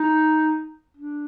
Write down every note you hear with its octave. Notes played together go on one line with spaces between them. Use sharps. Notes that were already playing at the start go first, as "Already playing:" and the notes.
Already playing: D#4
D4